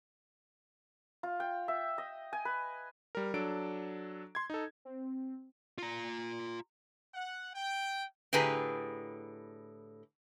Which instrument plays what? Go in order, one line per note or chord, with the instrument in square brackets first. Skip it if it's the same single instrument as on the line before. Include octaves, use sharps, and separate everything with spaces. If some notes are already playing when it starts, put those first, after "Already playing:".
[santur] F4
G5
E5
D#5
G#5
B4
[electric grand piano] G3 A#4
F#3 D4 A4 D7
C6 G#6
D#4 A4
[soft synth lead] C4
[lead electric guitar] F4 A#5
[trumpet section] F#5
G5
[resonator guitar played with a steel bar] A2 D3 G4 G#4 B4 A#5